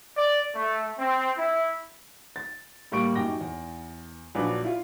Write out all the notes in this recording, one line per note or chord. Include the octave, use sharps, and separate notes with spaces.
D5
A3
C4
E4
A6
A2 G3 A#3 C#6 D7
F#2 D#4 G4 G5 A#6
E2
A#1 F#3 D4 B4 D5
E4 F4